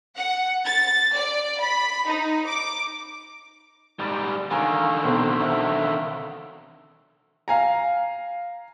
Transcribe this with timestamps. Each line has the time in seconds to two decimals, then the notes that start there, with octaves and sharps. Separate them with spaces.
0.17 F#5
0.66 A6
1.15 D5
1.62 B5
2.08 D#4
2.48 D6
3.99 G#2 G3 D5 B5 A6
4.51 D3 D#3 F5 G#5 A#5 E6
5.04 B1 C4 C5
5.41 E5
7.48 F5 G#5 A#5